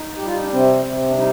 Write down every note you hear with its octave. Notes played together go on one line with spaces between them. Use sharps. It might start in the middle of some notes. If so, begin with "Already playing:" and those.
Already playing: D#4
G4
G3 F4
D#4
D4
C3 C4
C3
D4
G3 D#4